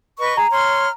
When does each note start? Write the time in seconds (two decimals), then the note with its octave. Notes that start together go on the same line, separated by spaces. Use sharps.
0.18 B4 D#5 C#6
0.37 G#4 A#5
0.52 C#5 C6 F6